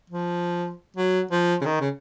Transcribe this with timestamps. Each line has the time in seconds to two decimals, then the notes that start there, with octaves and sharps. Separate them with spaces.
0.10 F3
0.96 F#3
1.31 F3
1.61 C#3
1.65 D#3
1.81 C#3